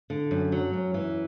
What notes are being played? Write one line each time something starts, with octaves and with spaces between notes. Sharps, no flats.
D3
F#2
F#3
F#2
E3